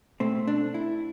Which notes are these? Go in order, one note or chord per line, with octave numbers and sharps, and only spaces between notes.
B2 A3 C4
D4
E4